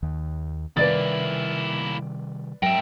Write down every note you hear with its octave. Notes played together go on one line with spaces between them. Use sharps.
D#2 D#3
C3 D#3 G3 A#3 E4 B4 D5 A6
G#2 F#3 A#4 E5 G5